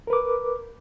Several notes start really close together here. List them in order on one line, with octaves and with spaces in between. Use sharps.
A#4 B4 D6